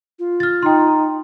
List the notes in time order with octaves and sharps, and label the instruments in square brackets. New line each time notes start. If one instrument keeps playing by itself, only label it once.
[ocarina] F4
[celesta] F6 A6
[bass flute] D#4 [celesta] G5 C6